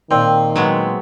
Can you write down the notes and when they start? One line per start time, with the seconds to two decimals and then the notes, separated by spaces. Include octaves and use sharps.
0.11 A#2 D#3 C4
0.56 F#3 G#3 B3